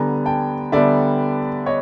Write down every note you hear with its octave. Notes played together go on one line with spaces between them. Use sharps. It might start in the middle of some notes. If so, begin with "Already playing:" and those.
Already playing: D3 G3 B3 G#5 A#5
G5 A5
D3 G3 B3 D5 E5
C#5 D#5